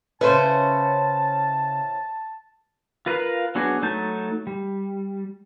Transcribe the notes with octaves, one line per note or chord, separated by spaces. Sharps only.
C#3 C#4 E4 B4 C5 A5
F4 A#4 B4 F5
F#3 B3 D4 F#4 G#4
F#3 A3 D#4 A5 G6
G3